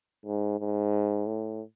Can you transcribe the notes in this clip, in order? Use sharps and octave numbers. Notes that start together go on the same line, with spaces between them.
G#2
G#2
A2